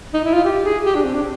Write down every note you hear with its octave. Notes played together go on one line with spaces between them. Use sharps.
D#4
E4
F4
G4
G#4
G4
D4
C4
D4